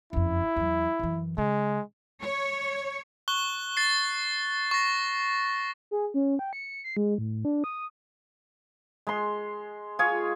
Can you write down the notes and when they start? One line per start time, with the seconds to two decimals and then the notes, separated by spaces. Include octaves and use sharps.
0.13 F#1 F2 E4
0.56 E2 F#3
1.00 F#2 E3
1.38 C#3 G#3
2.22 C#5
3.28 C#6 F#6 G7
3.77 A6 C7
4.71 C#6 A#6
5.91 G#4
6.14 C#4
6.39 G5
6.53 C#7
6.84 C7
6.97 G#3
7.18 A2
7.45 D4
7.64 D#6
9.07 G#3 C6
9.99 F4 G#4 C#5